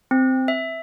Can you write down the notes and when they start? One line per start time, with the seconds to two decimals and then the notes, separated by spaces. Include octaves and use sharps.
0.11 C4
0.48 E5